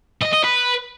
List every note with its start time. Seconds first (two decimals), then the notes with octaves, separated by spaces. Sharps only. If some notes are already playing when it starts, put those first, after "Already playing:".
0.22 D#5
0.33 D#5
0.44 B4